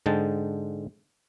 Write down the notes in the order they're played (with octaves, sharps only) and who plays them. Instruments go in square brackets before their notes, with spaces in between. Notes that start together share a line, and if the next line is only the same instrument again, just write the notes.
[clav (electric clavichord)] G#2 D3 G#3 G5 A5